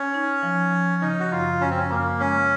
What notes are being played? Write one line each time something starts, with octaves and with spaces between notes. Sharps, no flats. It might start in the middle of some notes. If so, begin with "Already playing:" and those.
Already playing: C#4
D#4
F3
F3
C#3 D#4
F#4
F#2 F4
F#2 C#4
C4
C#4
F#2 A#3
G#3 C#4